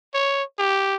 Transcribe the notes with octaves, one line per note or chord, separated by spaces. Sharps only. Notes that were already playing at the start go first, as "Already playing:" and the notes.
C#5
G4